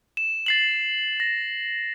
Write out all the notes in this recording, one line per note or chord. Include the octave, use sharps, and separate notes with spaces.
E7
A6 C7 F#7
A#6